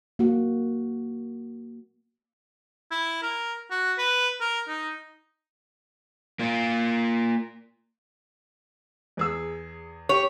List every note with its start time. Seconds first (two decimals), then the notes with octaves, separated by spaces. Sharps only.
0.19 A#3 F#4
2.91 E4
3.23 A#4
3.71 F#4
3.98 B4
4.41 A#4
4.68 D#4
6.39 A#3 F4
9.17 E2 G#4 E6
10.09 G4 C#5